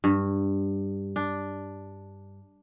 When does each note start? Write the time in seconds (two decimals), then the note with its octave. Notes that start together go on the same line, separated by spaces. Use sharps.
0.04 G2
1.16 D4